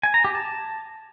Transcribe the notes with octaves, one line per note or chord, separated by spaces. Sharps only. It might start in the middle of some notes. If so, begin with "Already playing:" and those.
G#5
A#5
G4
A5